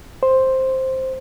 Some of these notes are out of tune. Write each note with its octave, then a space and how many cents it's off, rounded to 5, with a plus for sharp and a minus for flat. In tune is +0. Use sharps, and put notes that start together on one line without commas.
C5 +5